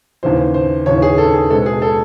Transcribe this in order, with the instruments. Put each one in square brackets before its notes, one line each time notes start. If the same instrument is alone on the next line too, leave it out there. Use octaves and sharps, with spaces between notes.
[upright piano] D#2 C#3 E3 C5
C5
D#2 C#3 E3 C#5
G#4
A4
G#4
B2 G#3 C4 A4
G#4
A4